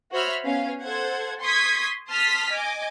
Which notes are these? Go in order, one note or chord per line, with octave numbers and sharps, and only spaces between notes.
F#4 C5 C#5 E5 B5 F6
B3 C#4 F5
A4 C5 F#5 G#6
C6 C#6 D#6 G#6 B6
A5 C6 D#6 F6 B6
D#5 G#5 D6